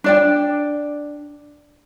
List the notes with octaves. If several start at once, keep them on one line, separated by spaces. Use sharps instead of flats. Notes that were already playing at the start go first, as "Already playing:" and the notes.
D4 D5 G5